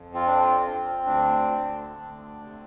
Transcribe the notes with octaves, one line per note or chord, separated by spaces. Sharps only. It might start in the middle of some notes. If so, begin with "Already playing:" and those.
Already playing: F2
C4 F4
D4
F4
C4
D2 D4
D2
D2
C3